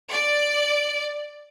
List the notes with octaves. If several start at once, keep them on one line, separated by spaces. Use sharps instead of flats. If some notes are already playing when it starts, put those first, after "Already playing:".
D5